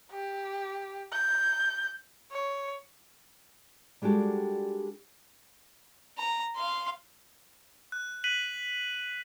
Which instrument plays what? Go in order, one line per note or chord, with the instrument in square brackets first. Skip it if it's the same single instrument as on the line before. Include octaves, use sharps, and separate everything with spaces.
[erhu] G4
G6
C#5
[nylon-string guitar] G3 G#3 D4 F#4 G4 A4
[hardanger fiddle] A#5
F5 C6
[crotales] F#6
F#6 B6 D#7 F#7